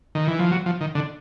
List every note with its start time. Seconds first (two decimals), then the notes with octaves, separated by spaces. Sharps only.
0.15 D#3
0.27 E3
0.39 F3
0.52 F#3
0.66 F3
0.81 D#3
0.95 D3